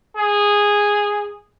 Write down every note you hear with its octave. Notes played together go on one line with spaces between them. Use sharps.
G#4